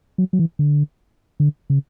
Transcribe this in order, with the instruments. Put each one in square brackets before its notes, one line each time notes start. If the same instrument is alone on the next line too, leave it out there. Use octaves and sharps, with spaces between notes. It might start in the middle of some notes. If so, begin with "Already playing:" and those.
[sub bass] F#3
F#3
E3
D3
D3
C#3